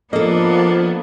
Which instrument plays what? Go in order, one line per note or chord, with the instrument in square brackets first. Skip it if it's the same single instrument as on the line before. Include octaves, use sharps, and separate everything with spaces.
[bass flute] F3 [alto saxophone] A#3 [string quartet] B3 D4 [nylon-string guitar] A4 D#5